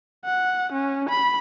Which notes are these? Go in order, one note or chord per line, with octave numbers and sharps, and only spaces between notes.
F#5
C#4
B5